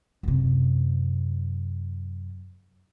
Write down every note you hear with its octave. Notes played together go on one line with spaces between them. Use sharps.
F#2 C3